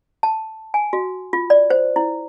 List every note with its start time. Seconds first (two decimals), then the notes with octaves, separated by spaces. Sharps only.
0.23 A5
0.74 G#5
0.93 F#4
1.33 F4
1.50 D5
1.70 C5
1.96 E4